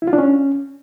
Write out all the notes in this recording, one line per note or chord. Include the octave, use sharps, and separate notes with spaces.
E4
F4
D4
C#4